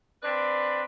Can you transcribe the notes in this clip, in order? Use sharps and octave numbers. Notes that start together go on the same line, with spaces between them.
C4 D4 B4 D5 B5